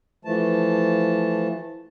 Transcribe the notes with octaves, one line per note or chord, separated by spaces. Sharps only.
E3 F3 A3 A5